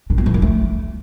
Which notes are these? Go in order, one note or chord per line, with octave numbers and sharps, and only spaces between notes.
D4
B3
F3
D4
A3